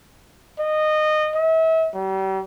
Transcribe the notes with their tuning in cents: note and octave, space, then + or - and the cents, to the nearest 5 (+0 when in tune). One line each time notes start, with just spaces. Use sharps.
D#5 -20
E5 -35
G3 -40